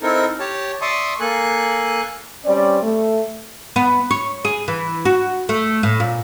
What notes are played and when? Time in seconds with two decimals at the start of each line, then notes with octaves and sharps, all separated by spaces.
0.01 C4 D#4 E4 A4 A#4
0.40 G4 C#5 A5
0.82 D5 E5 A5 C6 C#6 D#6
1.20 A#3 A4 G#5 F#6
2.45 G3 C4 C#4 D5
2.81 A3
3.76 B3
4.11 C#5
4.45 G#4
4.68 E3
5.05 F#4
5.49 A3
5.83 A2
6.00 A#2